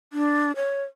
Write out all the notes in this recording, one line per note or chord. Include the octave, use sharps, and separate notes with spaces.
D4
C#5